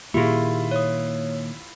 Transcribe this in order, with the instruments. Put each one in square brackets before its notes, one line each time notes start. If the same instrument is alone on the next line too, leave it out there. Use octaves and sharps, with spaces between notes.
[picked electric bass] A#2 D#3 A#3 [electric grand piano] E4 F4 [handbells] G4 G#4
[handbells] C#5 D#6